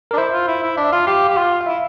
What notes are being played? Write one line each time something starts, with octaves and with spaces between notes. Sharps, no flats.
D4 A#4
E4 C5
F4
E4
E4
D4 E5
F4 F5
G4 F5
G4
F4
F5
E4 E5